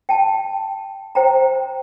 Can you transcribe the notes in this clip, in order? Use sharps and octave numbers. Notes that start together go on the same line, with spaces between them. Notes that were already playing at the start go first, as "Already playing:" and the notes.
G5 A5
C5 G5 A#5